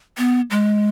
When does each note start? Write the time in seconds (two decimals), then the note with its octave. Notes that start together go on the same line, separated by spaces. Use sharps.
0.18 B3
0.51 G#3